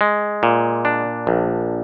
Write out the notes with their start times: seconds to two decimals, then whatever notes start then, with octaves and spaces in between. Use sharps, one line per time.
0.01 G#3
0.43 A#2
0.85 D4
1.27 A#1